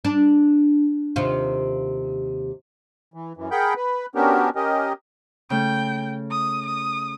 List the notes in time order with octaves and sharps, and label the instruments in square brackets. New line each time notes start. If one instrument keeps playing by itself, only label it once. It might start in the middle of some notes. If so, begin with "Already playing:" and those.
[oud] D4
D#2 C3 F4
[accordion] E3
F#2 E3
G#4 A#4 F#5 G5 B5 G6
B4
B3 C#4 D4 F#4 G4 A#4
C#4 G4 A#4 D#5
[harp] C#3 A3 [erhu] G5
[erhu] D#6
D#6